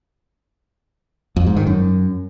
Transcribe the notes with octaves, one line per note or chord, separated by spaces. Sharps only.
F2
G#2
D#3
F#2